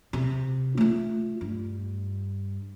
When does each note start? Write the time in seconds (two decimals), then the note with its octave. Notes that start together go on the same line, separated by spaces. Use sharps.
0.13 C3
0.77 A3 F4
1.41 G2